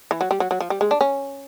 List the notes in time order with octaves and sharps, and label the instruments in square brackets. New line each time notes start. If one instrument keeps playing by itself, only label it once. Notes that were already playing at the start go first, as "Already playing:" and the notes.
[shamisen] E3
F#3
G3
F#3
F#3
F3
G3
G#3
D4
C#4